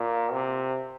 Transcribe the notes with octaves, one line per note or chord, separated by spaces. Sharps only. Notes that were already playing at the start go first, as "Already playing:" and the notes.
Already playing: A#2
C3